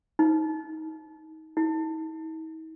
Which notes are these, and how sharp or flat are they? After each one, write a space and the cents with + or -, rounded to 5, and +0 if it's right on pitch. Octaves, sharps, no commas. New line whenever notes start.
D#4 +25
D#4 +45